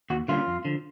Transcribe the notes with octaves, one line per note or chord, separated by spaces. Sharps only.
D#2 F#4
D3 G3 A#3 C#4 F4
F2
D3 F3